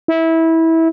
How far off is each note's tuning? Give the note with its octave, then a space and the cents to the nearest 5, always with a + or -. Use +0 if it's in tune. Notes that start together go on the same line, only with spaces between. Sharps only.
E4 -20